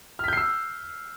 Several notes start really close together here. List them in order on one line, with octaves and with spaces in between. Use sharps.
F6 B6 G6 C7 E6